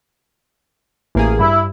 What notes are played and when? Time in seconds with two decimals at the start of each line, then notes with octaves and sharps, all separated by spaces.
1.15 A1 A#3 G#4
1.39 G2 E4